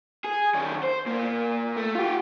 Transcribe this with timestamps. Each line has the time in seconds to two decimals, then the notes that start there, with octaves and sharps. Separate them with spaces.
0.24 G#4
0.54 D#3 C#4
0.84 C5
1.06 A#2 A#3
1.77 A3
1.95 F4 G4